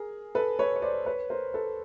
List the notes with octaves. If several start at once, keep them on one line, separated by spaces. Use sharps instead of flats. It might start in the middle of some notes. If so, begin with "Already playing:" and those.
Already playing: G#4 A#4
A4 B4
B4 C#5
C#5
C5 D5
B4 C#5
A#4 C5
A4 B4